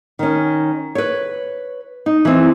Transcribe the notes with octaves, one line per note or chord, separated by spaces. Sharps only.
D#3 C#4
B4 C#5
D#4
E3 C4